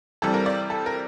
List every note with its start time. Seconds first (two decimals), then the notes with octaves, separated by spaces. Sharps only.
0.22 C3 E3 G3 A4
0.34 A#4
0.46 D5
0.70 A4
0.86 A#4